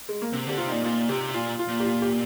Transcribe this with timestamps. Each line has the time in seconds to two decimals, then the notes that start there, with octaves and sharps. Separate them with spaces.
0.09 G#3
0.22 A#3
0.33 C3 C4
0.46 D3 G4
0.58 C3 F4
0.67 A#2 D#4
0.84 A#2 F4
1.09 C3 G4
1.34 A#2 F4
1.59 F4
1.68 A#2
1.80 G4
1.86 F4
2.02 G4